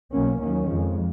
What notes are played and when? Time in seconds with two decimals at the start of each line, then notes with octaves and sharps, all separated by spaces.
0.12 B1 B2 F#3 A#3 C#4
0.40 D#2 D#3 F#3 A#3 C#4
0.69 F2 F3 G#3